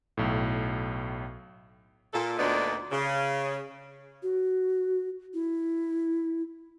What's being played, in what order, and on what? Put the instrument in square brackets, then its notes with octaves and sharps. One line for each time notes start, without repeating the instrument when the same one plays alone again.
[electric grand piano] B1 A2
[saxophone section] A#2 A4
D2 A#2 B3 D4 D#4 D5
C#3
[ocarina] F#4
E4